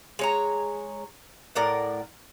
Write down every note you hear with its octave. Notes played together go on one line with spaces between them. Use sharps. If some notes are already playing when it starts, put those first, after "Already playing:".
G#3 C#5 A#5
A2 A#4 D5 F#5